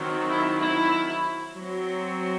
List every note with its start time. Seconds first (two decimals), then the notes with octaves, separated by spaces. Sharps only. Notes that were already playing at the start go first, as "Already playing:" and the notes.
Already playing: D#3 F#3 C4
0.29 E4
0.61 E4
1.56 F#3 C4